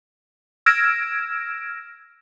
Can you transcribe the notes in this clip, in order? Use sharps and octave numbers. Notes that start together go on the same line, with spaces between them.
E6 F6 G#6 A#6 D7 E7